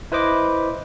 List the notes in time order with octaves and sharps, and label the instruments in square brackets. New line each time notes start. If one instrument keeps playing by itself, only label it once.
[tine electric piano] E4 B4 C5 D#5 D6